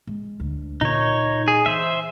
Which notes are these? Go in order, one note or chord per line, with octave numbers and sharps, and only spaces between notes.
G#3
D2
A#2 D#4 C#5
G#4
E3 C5 E5